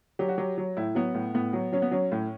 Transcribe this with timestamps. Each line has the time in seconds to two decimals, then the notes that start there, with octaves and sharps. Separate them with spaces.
0.19 F#3 G4
0.28 F#4
0.38 F#3 G4
0.58 F#3
0.77 A2 E4
0.95 F#3 B3
1.14 A2
1.34 A2 B3
1.53 F#3
1.72 F#3 C#4
1.82 B3
1.91 F#3 C#4
2.12 A2